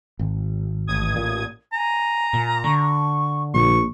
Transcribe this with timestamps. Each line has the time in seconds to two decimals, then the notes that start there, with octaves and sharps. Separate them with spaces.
0.19 G#1
0.87 A1 D#6 G#6
1.16 A#2
1.73 G#5 A#5
2.33 A#2
2.64 D3 C#6
3.54 A#1 C#6